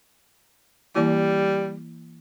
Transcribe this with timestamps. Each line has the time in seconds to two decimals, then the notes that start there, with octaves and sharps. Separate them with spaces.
0.95 E3 G3 A#3 E4